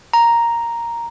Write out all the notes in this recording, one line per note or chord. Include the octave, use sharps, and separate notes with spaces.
A#5